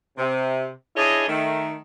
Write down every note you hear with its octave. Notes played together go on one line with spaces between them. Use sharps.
C3
D4 E4 G#4 C#5 D#5
D#3 A3